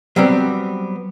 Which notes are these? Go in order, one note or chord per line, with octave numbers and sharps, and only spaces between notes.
F#3 G3 B3 C4